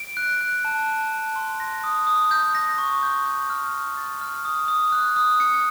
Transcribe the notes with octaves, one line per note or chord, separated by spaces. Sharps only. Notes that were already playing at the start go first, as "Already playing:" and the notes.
Already playing: D7
F#6
F#6
A5
A5
A5
C6
A#6
D#6
D#6
G6
A#6
C#6
G6
G6
F6
F6
A6
F6
D#6
D#6
F#6
D#6
C#7